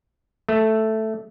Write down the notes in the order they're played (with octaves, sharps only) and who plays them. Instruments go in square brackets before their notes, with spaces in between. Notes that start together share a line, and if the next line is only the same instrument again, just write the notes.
[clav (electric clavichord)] A3